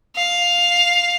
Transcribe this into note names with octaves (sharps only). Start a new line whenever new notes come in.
F5